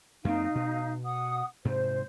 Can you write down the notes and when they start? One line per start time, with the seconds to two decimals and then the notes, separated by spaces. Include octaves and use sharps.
0.25 F#2 A#3 C4 D#4 F5
0.55 B2
1.05 F#5 D#6
1.65 G#2 C3 C5